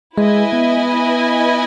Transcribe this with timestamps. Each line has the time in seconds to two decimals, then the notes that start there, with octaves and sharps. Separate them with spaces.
0.17 G#3 E4 B4 D#5 G#5
0.53 B3